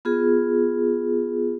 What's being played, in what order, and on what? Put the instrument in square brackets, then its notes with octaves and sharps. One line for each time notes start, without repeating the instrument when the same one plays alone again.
[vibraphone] B3 F4 G#4